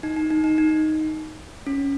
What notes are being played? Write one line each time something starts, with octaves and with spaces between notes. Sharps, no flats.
D#4
D#4
D#4
D#4
D#4
C#4